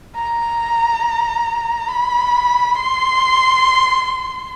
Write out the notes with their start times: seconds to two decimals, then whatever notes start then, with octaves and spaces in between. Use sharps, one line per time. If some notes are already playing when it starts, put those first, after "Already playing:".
0.15 A#5
1.89 B5
2.76 C6